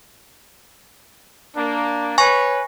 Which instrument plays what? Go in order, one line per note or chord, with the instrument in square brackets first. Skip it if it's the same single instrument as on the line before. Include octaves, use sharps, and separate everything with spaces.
[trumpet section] A#3 D4
[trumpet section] B4 C#5 [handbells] G#5 C#6 A#6